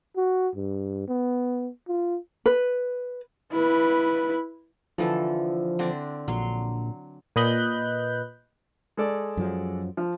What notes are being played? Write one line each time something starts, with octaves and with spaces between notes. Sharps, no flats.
F#4
G2
B3
F4
B4
E4 B4
D3 E3 F3 A4
D3 C4 D4
A#1 F#3 C6
A#2 B4 D#5 B5 F#6 G6
G#3 A4 D5
F#2 F3 F#3
F3